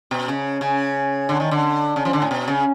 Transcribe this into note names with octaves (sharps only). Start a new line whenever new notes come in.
B2
C#3
C#3
D3
D#3
D3
C#3
F3
D3
A2
B2
C#3